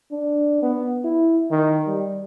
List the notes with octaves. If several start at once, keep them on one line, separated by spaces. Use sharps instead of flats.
D4
B3
E4
D#3
G3